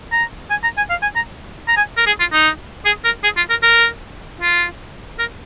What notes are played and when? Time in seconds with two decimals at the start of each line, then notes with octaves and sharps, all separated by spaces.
0.12 A#5
0.50 G#5
0.63 A#5
0.77 G#5
0.90 F5
1.02 G#5
1.16 A#5
1.68 A#5
1.77 G#5
1.97 A#4
2.07 G#4
2.20 F4
2.33 D#4
2.85 G#4
3.05 A#4
3.24 G#4
3.37 F4
3.50 A#4
3.63 A#4
4.41 F4
5.19 A#4